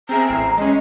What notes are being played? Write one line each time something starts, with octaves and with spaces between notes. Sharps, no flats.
C4 G#4 E5 A#5
A1 C7
G#3 C#4 D#5